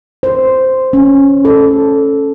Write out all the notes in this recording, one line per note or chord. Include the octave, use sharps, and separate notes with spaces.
C5
C#4
A4